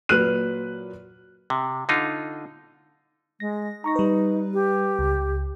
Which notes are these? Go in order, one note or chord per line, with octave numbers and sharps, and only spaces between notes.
A#2 F#3 B4 F6 F#6 D#7
C3
D3 D#4 F4
G#3 A#6
D#4 A#5 C#6 A#6
G3 B4
G4
C#2